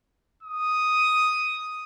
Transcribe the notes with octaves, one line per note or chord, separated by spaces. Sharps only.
D#6